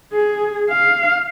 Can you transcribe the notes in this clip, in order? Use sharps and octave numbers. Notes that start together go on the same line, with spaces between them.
G#4
F5